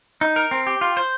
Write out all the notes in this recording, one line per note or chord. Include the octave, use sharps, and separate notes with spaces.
D#4
A#4
C4
G4
F4
C5